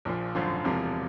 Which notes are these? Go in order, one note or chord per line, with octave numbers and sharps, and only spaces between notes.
A#1 A#2 F3
G#1 F#2 D3 F3
E1 E2 C3 F3